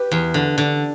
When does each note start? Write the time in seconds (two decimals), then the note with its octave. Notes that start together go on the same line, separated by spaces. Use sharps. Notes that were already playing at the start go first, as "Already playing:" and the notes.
Already playing: G4 B4
0.12 E2
0.34 D3
0.58 D3